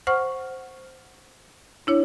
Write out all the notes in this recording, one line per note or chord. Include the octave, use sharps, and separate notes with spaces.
C5 F#5 C#6 F6
D4 E4 C#5